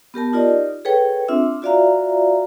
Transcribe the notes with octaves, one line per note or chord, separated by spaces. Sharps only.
B3 G4 A#4 A5
D#4 F4 G4 A#4 D5 D#5
G#4 A4 B4 C#5 G5
C4 D4 F4 E5 E6
F4 F#4 D5 E5 F5 A#5